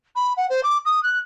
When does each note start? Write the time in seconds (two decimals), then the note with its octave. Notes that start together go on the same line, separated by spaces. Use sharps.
0.15 B5
0.37 F#5
0.50 C5
0.63 D6
0.85 D#6
1.03 F#6